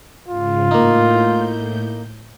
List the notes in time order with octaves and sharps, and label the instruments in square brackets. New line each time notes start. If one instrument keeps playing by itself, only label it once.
[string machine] G#2 C#3 [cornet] F4
[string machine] A2 G6 [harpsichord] A#3 D#4